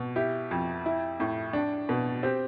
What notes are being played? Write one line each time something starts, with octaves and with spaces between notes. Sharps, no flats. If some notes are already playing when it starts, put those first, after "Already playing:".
Already playing: B2
E4 G4
F2
E4
A2
D4
B2
C4 G4